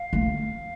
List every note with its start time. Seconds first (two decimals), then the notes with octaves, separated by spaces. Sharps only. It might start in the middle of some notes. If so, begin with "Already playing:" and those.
Already playing: F5
0.13 A3